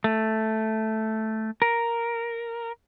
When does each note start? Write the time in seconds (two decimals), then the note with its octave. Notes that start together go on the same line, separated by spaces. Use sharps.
0.04 A3
1.62 A#4